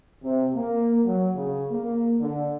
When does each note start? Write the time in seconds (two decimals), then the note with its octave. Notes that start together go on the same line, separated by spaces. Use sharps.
0.23 C3
0.54 A#3
1.05 F#3
1.35 C#3
1.71 A#3
2.21 D3